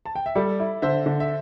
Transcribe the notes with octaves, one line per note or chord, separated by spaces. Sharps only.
A5
G5
E5
G3 A4 D5
E4
D3 C5 E5
D3
E5